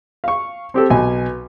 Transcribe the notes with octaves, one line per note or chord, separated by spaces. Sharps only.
F5 C#6
C4 G4 A4
B1 G#5